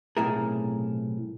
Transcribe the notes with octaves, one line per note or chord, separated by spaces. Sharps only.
B1 A2 C3 E4 G#4 A#4